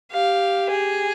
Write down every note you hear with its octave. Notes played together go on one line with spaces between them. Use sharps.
G4 F5
G#4